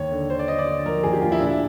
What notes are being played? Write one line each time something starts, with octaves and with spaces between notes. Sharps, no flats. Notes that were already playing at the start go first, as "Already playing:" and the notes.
Already playing: D#2 C#5
D3
D3 C5
D5
D3 D#5
D5
D3
F3 A#4
D#2 G#4
G4
D#2 F4
E4
A#2 D4